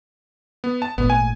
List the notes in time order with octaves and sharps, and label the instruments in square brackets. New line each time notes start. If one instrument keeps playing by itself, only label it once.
[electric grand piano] B3
A5
[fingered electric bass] G#1 A#2 A3 [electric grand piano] B3
[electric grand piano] G#5